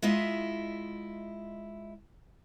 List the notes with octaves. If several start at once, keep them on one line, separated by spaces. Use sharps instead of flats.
G#3 E4 F4 D#5 E5